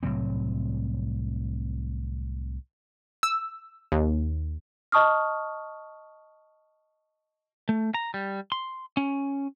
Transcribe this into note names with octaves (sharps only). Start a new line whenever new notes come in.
C2 A2 F#3 C4
E6
D#2
D#5 A5 C#6 D#6 F6
A3
A#5
G3
C6
C#4